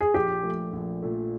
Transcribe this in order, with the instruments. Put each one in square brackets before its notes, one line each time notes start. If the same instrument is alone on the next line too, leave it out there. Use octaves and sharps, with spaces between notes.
[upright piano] G#4
[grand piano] A#1 [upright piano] G4
[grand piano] A#2 F3 A3
A#1
A#2 F3 A3